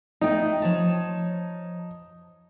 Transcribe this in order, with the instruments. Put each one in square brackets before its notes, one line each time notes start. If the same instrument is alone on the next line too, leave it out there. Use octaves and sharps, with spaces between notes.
[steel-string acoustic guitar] A3 B3 G5 [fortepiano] D#4
[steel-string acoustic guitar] F3 C#5 A5